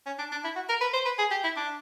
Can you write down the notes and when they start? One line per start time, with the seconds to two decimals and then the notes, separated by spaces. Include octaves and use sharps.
0.06 C#4
0.19 D4
0.32 D4
0.44 E4
0.56 F#4
0.69 A#4
0.81 B4
0.94 C5
1.05 B4
1.19 G#4
1.31 G4
1.44 E4
1.56 D4